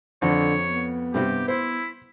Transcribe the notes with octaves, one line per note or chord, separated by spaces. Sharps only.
F2 D3 C#5
B3
G2 C3 G3 G4
E4 C5